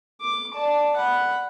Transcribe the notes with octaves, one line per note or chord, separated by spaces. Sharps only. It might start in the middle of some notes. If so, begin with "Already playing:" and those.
D6
D5 A5
F#5 B5